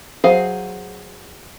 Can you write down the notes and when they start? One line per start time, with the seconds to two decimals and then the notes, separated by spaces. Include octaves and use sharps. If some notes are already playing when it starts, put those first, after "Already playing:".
0.24 F#3 F#4 G#4 C5 F5